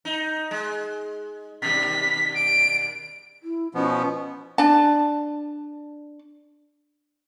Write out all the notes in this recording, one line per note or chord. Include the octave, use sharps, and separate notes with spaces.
D#4
G#3
B2 D#3 G3 B6
D7
E4
B2 F3 B3 C#4
D4 A5